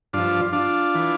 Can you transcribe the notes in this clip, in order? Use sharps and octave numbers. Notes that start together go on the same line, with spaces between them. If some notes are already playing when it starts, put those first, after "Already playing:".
G2 F3 D4 F4
D4 F4
E3